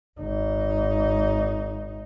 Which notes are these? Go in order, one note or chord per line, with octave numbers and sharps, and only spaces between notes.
G#1 D#4